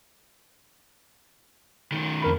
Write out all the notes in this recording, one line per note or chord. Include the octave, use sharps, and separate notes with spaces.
B1 D#3
F2 A#4 B5